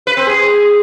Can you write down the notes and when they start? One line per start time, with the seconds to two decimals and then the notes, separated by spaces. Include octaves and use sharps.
0.07 B4
0.17 C4
0.27 G#4